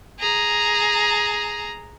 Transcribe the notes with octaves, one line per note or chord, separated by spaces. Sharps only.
G#4 A#5